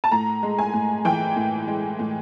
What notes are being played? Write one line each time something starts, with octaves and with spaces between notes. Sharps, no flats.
A5
A2 A#5
G#3
G#5
A2
E3 G5
A2
G#3
A2